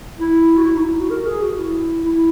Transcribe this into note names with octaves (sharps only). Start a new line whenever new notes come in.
E4
F#4
E4
D#4
E4
F#4
A#4
G#4
F#4
E4
E4